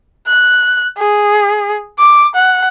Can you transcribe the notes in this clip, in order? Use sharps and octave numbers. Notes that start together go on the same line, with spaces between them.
F#6
G#4
D6
F#5